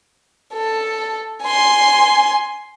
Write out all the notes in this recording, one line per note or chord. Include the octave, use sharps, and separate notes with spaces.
A4
G#5 C6